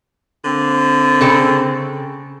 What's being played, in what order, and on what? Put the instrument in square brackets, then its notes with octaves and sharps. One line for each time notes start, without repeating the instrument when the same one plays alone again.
[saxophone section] D3 A#3 C4
[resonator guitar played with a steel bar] C#3 A4 G5